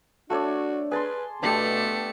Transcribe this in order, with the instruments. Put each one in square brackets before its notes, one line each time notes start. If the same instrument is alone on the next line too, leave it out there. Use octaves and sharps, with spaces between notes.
[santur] A3 C#5 D5 [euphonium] D4 [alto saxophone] F#4
[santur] G#4 A5 C6 [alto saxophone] B4
[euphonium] B2 [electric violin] A3 C#7 [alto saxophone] B3 [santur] D4 G4